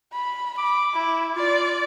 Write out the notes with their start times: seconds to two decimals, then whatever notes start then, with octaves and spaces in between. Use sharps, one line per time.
0.13 B5
0.58 B5 D6
0.94 E4
1.36 F4 D5